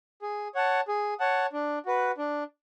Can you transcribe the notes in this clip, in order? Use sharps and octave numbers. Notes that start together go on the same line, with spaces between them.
G#4
C#5 F#5 A5
G#4
C#5 F#5 A5
D4
F#4 B4
D4